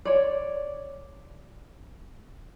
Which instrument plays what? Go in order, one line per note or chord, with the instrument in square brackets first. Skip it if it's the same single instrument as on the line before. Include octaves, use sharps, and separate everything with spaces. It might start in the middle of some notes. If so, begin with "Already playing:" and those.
[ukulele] C#5 D5